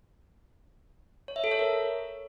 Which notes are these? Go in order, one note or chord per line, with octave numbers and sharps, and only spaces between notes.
C#5
E5
A4
C#5
A#4